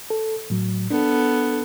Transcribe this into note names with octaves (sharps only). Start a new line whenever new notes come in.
A4
A2 F#3
B3 D4 A4